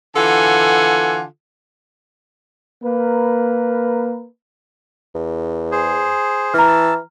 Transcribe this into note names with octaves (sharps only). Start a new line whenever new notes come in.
D3 E3 F4 A4 F#5 G#5
A#3 A#4 B4
E2
G#4 C5
E3 A#5 F6
A5 E6